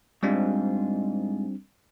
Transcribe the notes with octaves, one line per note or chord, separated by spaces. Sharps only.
G#2 G3 C4 D4 F4